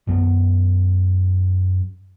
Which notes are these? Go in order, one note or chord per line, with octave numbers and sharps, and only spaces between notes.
F#2 B3